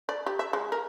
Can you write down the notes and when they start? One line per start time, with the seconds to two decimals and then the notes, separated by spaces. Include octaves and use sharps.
0.09 D5
0.26 G4
0.39 E5
0.53 G#3
0.72 A#4